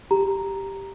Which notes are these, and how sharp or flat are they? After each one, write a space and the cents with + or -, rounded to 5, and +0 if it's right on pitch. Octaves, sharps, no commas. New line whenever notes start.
G4 +0 A#5 +0